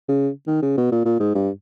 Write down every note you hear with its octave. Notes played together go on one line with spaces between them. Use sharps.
C#3
D#3
C#3
B2
A#2
A#2
G#2
G2